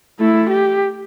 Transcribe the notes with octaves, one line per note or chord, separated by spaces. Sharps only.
A3 E4
G4